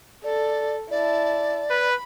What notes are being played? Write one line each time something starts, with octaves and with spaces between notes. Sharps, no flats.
A4 D5
E4 D5 A5
B4 B5